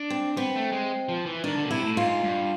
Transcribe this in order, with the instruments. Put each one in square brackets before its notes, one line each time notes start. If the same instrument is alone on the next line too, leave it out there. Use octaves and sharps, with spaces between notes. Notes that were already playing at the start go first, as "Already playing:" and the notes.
Already playing: [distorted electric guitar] D4
[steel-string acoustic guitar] C4
[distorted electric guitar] B3 [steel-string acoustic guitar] C4
[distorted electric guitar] A3
G#3
F3
E3
[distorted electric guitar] D#3 [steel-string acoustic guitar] D4
[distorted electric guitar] D3
B2
[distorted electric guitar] C3 [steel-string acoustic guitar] E4
[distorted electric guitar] A2
[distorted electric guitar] G#2 [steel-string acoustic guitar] F4
[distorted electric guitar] G2